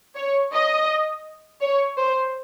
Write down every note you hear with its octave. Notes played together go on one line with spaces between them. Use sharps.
C#5
D#5
C#5
C5